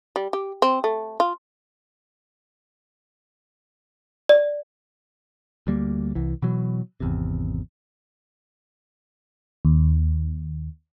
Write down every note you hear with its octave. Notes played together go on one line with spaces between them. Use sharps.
G3
G4
C4
A3
F4
D5
D2 G3 A#3
C2 E3
B2 E3 F#3
G#1 E2 C3
D#2